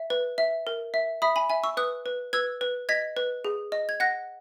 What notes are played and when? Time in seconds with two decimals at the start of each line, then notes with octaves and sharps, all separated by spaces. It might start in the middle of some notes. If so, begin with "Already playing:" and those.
Already playing: E5
0.10 B4
0.38 E5
0.67 A#4
0.94 E5
1.22 E5 B5 D#6
1.36 G#5 B5
1.50 E5 G#5
1.64 C#6 E6
1.77 B4 D#6 F#6
2.06 B4
2.33 B4 E6 G#6
2.61 B4
2.89 D#5 G#6 B6
3.17 B4
3.45 G#4
3.72 D#5
3.89 G#6
4.00 F#5 F#6 A#6